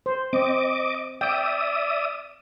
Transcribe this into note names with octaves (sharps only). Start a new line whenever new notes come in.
C5
C4 D#5 D6
D5 E5 G5 D#6